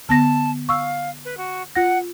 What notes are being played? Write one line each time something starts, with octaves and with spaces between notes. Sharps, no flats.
D3 B3 A5 A#6
F5 C#6 E6
B4
F#4
F4 F#5 A#6